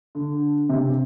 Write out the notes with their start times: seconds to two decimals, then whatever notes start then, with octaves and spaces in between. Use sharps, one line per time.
0.15 D3
0.69 C3